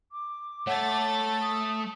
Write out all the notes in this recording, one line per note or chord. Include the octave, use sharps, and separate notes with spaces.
D6
A3 A4 C#5 F#5 A6
D#6